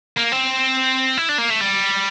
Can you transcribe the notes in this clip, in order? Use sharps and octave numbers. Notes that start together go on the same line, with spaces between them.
A#3
C4
E4
D4
A#3
A3
G3